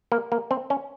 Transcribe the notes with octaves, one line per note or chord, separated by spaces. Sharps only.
A#3
A#3
C4
C#4